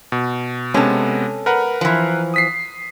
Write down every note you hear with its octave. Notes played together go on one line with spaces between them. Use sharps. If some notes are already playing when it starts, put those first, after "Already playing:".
B2
C3 G#3 B3 C#4 A4
A#4 B4 F#5
E3 F3
D#6 B6 C7